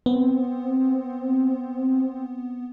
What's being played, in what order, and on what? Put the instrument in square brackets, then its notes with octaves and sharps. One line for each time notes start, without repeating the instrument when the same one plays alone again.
[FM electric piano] B3 [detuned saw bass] C4